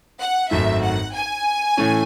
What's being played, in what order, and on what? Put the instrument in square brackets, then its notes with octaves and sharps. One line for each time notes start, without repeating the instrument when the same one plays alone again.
[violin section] F#5
[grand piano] G#1 F#2 D#3 A3 [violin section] E5
[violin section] F#5
G#5
[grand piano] A2 E3 A3 C#4